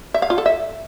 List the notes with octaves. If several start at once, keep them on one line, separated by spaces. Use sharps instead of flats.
E5
F5
F4
A4
E5